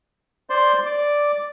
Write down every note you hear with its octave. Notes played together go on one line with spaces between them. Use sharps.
C5 D5 C6
D5 D6